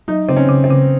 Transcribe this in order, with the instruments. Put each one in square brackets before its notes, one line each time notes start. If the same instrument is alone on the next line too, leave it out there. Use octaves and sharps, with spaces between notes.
[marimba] F#3 [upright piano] D#4
[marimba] C#3 [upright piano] C4
[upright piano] C#4
[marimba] C#3
[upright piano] C4
[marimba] C#3